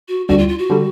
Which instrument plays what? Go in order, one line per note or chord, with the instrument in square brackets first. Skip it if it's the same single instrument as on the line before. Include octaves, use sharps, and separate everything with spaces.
[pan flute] F#4
[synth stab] D2 D3 G3 [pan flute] F#4
[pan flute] F4
F4
F#4
[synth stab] D3 G3